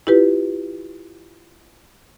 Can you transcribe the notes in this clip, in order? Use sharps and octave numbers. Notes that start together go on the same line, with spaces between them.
E4 F4 G4 B4